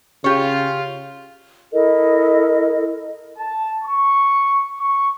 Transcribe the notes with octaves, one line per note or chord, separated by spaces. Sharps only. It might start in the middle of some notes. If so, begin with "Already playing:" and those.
C#3 F4 G4 C#5
E4 A4 A#4 D#5
A5
C#6
C#6